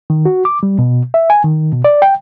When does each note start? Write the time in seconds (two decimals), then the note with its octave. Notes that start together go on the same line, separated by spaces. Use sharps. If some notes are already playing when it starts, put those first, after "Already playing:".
0.10 D#3
0.25 F#4
0.45 D6
0.63 G3
0.79 B2
1.14 E5
1.30 G#5
1.44 D#3
1.73 B2
1.85 D5
2.02 G5